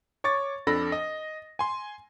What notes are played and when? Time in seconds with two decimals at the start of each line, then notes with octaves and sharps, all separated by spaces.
0.24 C#5 C#6 D6 A6
0.67 F2 D4 A4 B5 A#6
0.92 D#5
1.59 G#5 C6